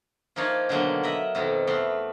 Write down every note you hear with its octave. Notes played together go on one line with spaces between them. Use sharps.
F3 A#3 D#4 C#5 D5 F5
B2 D3 D#3 F#3 G#3 A#3
A#4 D#5 E5 B5
F2 B2 D#3
E2 A3 B3 C6